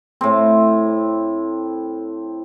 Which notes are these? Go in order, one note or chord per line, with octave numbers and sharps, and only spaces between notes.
A2 C4